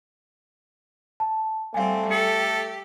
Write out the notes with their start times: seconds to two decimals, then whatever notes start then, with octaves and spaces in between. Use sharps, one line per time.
1.20 A5
1.74 G3 A3 C4 F5 G#5
2.11 G4 A4 C#7